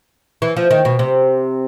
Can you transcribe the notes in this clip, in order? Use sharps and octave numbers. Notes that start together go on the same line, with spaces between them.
E3
F3
D#3
B2
C3